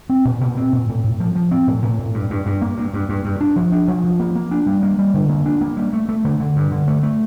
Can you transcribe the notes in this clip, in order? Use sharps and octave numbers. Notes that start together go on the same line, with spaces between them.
C4
A#2
A#2
C4
A#2
A2
A2
F3
F3
C4
A2
A2
A2
G2
G2
G2
A#3
G2
G2
G2
G2
D4
F3
D4
F3
F3
A#3
A#3
D4
G3
A#3
G3
D3
A#3
D4
A#3
G3
A3
A3
D3
D3
G2
D3
A3
A3